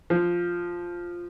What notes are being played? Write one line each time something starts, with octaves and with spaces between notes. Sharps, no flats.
F3